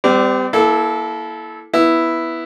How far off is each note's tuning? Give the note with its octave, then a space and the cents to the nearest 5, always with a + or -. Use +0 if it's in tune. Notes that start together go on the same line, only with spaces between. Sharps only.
G3 +5 C4 -40 D5 +0
A#3 +20 E4 +0 A4 -25
B3 +0 E4 +0